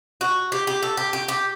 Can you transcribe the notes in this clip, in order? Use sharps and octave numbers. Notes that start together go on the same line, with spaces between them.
F#4
G4
G4
A4
G4
G4
G4